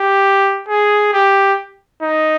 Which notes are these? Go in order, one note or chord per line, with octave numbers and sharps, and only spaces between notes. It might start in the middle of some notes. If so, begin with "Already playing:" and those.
Already playing: G4
G#4
G4
D#4